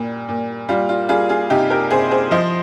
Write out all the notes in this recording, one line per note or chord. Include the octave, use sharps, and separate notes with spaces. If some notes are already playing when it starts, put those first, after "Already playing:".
Already playing: A#2 G3
A#2
G3 F4
F4
G3 F4 G#4
F4 G#4
C3 D#4 G4
G4 A#4
C3 G#4 C5
G#4 C5
F3 C5 D#5